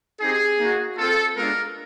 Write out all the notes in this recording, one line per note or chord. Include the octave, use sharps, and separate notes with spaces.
C4 D#4 G4 G#4
A#3 D#4 F#4
C4 F4 A4
G#3 B3 D4 F4 A#4